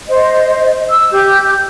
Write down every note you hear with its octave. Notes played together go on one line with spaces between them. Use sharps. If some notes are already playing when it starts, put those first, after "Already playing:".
C5 D#5
E6
G4 G6